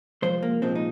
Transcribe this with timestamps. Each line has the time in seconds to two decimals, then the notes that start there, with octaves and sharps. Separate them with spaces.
0.22 C2 A#2 F3 G#3 C5
0.43 A#3
0.62 C2 A#2 F3 G#3 C4
0.75 D#4